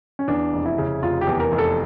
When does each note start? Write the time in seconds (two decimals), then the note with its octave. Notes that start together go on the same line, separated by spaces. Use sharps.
0.19 C#4
0.28 E2 D4
0.53 F1
0.66 E4
0.78 C#3
1.02 F1 F4
1.21 G4
1.27 E2
1.40 A#4
1.52 F1
1.58 A4